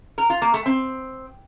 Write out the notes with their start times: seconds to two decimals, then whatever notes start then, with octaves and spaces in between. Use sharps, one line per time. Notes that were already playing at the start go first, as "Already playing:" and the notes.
0.18 A#4
0.30 F4
0.42 A#3
0.54 A3
0.66 C4